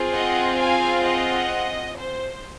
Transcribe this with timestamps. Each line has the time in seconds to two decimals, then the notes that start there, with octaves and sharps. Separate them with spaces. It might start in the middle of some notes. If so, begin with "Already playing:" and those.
Already playing: C4 F4 G#4
0.13 D#5 F#5
0.58 F5 G#5
1.05 D#5 F#5
1.97 C5